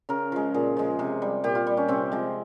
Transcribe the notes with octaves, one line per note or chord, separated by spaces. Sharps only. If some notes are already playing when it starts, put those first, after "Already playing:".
C#3 A#4
F3 G#3
A#2 G#4
F3 G#3
C3
G3
A#2 G4
F4
G3
C#4
C3 C4
F3 G#3